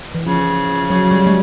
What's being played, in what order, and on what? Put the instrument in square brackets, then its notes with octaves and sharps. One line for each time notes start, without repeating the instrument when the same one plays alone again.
[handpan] E3
[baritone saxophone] C#3 [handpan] F3
[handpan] F#3
G3
G#3